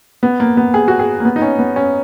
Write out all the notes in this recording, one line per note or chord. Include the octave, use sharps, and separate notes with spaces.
B3
A#3
B3
G#4
F#4
G#4
A#3
B3
D#4
C#4
B3
C#4